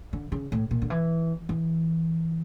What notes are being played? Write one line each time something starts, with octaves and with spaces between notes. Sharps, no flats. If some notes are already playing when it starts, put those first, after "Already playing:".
D3
C#3
A2
A#2
D3
E3
E3